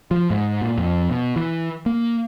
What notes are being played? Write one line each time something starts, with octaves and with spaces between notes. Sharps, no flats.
F3
G#2
A#2
F2
B2
E3
A#3